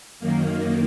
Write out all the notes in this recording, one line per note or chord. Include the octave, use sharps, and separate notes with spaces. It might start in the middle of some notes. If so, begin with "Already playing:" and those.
F#2 D#3 A#3